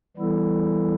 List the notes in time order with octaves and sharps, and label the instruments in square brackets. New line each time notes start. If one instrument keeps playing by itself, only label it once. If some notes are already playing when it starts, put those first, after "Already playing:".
[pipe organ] E3 G3 B3 E4 A4